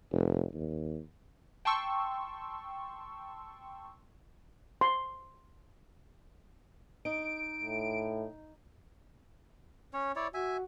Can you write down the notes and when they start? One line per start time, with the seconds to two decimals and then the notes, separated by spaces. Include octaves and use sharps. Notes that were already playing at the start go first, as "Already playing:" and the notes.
0.12 F1
0.54 D#2
1.65 G5 A5 C6 C#6 E6
4.81 C6
7.05 D#4 D7
7.63 A2
9.94 C#4 C#5
10.16 E4 C#5 D5
10.34 F#4 E5 G#5